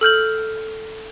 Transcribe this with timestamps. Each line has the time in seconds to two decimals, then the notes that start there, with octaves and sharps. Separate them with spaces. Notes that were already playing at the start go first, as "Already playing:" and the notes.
0.01 A4 F6 G6 F#7